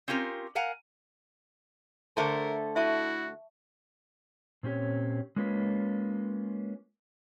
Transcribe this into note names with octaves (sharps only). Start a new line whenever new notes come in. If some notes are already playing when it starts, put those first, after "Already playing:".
C4 C#4 F4 G4 A#4
A#4 F5 F#5 G#5 A#5
D3 A3 A#4 C5 A5
E4 F#4 E5 A5 C#6
A#2 C4 C#4 G4 C#5
G#3 A#3 C#4 F4 B4